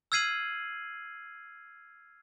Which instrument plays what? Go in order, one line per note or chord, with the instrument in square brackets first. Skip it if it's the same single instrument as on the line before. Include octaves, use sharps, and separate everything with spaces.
[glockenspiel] E6 F6 G#6 C7 D#7 F#7